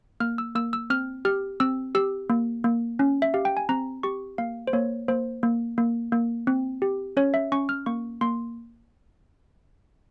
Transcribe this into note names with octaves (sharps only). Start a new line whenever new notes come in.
A#3 F6
E6
A#3 E6
E6
C4 F6
G4 F6
C4 E6
G4 E6
A#3
A#3
C#4
E5
G4 F5
G5
G#5
C4 A#5
G4 C#6
A#3 F5
C5
A#3 C#5
A#3 C5
A#3
A#3
A#3
C4
G4
C#4 C#5
E5
C#4 C#6
F6
A#3 C#6
A#3 C6